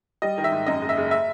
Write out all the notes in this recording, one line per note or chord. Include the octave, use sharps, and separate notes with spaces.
G3 D#5
D#3
E5
G#2
F#2 D#5
F#1
E5
F#1
E5